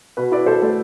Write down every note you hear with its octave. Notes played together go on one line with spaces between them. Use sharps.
B2 B4
E4 B4 D5
B2 A4 C5
A3 A4 C5